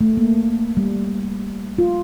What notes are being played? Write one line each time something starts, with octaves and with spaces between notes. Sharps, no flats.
A3
A#3
G3
F4